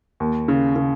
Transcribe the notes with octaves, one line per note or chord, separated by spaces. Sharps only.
D#2
C#3
C#3